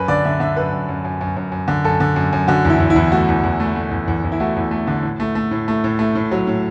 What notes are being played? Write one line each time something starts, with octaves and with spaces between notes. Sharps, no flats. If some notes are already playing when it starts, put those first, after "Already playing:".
Already playing: F#2 B4
D3 D5
D3 E5
D3 E5
F#2 B4
F#2
F#2
F#2
F#2
F#2
F#2
D3
F#2 A4
D3
F#2
F#2
D3 F#4
E2
E4
E2
E4
E2
A3 F#4
E2
E2
A3
A3
E2
E2
E2
E4
A3 F#4
E2
A3
D3
A2
A3
A3
A2
A3
A2
A3
A2
F#3
A2